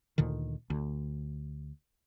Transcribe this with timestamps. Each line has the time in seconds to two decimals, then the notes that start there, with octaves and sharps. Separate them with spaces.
0.18 D2 A#2 D3 D#3
0.70 D2